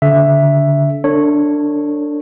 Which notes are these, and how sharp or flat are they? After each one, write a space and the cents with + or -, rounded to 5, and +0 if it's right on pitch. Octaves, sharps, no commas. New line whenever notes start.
D3 -30 E5 +5
D4 +0 A4 +45 C#5 -10